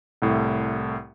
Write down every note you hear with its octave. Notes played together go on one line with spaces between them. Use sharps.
C2 A2